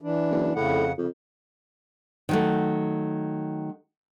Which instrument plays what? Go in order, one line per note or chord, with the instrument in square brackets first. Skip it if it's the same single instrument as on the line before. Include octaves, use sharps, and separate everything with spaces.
[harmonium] E3 D4
[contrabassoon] F#1
[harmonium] F2 C#3 F#5 [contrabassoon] A2
[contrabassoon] F2 [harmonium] C#3
[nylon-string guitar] D#3 F#3 A3